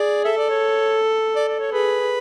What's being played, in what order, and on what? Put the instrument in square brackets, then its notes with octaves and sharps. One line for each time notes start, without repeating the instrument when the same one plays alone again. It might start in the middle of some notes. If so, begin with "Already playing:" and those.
Already playing: [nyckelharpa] G#4 [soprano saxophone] D5
[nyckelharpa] A4 [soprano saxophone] E5
[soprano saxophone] D5
C#5
D5
D5
C#5
[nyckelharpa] G#4 [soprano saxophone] B4